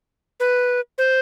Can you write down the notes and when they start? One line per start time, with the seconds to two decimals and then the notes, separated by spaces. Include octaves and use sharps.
0.40 B4
0.98 C5